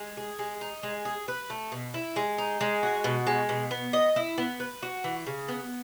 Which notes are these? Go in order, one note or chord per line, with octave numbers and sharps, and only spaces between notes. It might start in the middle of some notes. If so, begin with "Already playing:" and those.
Already playing: G#3
G#4
G#3
D#4
G#3
G#4
B4
A3
B2
E4
G#3
D#4
G#3
F#4
B2
G#3
B2
B3
D#5
E4
B3
B4
F#4
E3
C#3
B3